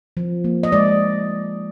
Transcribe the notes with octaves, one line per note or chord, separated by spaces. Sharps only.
F3
A#3
D#5
G#3 D5